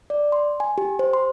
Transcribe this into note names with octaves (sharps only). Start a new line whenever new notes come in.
D5
C6
G#5
G4
C5
C6